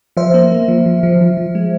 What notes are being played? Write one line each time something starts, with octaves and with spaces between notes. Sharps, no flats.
F3 C5 E5
A#3
A#3
F3
F3
F3
F3
F3
G#3